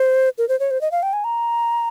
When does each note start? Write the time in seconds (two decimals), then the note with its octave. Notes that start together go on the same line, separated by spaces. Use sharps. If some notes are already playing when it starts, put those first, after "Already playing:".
Already playing: C5
0.38 A#4
0.49 C5
0.60 C#5
0.71 C5
0.81 D#5
0.91 F5
1.03 G5
1.13 G#5
1.24 A#5